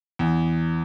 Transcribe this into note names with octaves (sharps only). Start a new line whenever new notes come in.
E2